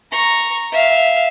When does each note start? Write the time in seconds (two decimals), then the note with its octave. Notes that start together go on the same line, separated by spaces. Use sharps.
0.12 A#5 C#6
0.72 E5 F5